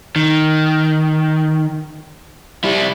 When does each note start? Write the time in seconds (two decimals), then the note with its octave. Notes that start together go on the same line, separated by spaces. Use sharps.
0.16 D#3
2.64 G3 E4